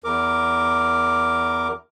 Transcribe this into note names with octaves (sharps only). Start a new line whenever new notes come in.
E2 A#4 D6